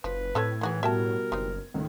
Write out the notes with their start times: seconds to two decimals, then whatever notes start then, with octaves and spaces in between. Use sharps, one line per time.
0.04 F#1 F3 B4
0.35 A2 C4 A4 C#5 E6 G#6
0.61 D#3 E3 F#4 G#4
0.83 B2 G3 F#4 A#4 E5 G5 A5
1.32 F#1 B3 C4 D#4
1.74 C#2 A2 D#3 G#3